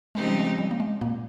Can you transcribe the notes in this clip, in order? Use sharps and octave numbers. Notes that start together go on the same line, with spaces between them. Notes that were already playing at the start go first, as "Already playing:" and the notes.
C#3 F3 G#3 C4 D#4 G4
G3
G#3
G3
A#3
G#3
A#2 A#3